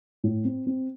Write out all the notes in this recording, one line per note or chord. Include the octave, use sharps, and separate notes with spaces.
A2
C4
C4